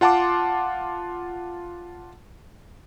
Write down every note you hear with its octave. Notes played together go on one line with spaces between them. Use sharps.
F4 F#5 A5 C6 D6